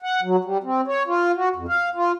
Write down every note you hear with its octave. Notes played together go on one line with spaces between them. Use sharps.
F#5
F#3
G3
C4
C#5
F4
F#4
F2
F5
F4